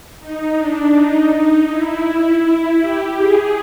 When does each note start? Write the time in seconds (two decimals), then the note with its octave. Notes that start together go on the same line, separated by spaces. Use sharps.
0.20 D#4
0.56 D4
0.94 D#4
1.69 E4
2.81 G4
3.18 G#4